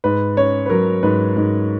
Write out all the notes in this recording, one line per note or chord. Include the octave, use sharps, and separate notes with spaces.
G#2 B4
C#4 C#5
B4
F#3 A#4
G#2 B4
G#2